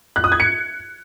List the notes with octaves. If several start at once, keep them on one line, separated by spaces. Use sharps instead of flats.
F#6
D#6
G#6
C#7